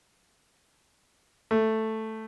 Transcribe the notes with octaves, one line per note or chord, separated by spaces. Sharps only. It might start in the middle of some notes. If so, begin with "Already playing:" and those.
A3